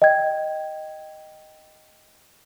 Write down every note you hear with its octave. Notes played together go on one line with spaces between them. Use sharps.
D#5 G5 G#6